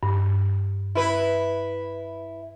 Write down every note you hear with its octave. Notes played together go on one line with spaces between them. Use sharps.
G2
E4 B4